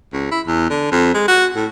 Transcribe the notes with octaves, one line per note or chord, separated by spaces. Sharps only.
C#2
E4
E2
D3
F2
G#3
F#4
A2